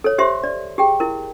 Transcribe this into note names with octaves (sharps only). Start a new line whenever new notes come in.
A4 C#5
G4 C5 E5 C6
D5
G4 G#4 G5
E4 A#4